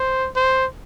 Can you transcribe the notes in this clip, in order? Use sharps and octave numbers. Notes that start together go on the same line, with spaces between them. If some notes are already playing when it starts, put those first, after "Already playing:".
Already playing: C5
C5